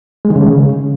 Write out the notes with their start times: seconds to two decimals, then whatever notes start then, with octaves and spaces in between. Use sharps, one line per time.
0.25 G#3
0.30 D#3
0.36 C#3